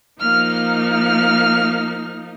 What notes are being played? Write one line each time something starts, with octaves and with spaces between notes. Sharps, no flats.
F3 A#3 D#4 F6
F6